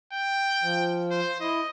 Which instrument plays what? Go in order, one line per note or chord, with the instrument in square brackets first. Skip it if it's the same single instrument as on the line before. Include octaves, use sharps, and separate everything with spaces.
[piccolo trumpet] G5
[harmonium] F3
[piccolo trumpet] C5
[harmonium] E4 [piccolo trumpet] D#5